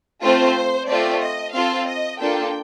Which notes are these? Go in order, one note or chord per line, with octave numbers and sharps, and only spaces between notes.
A3 C4 F4 C5
A3 C4 F4 D5
D#5
C4 F4 A4 F5
D#5
A#3 D4 F4 A4 G5